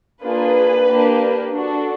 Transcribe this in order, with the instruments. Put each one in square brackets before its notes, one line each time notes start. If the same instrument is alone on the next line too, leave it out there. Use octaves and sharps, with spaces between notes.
[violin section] A#3 D4 F4 G#4 B4
A#3 D4 G4
D4 F#4 A4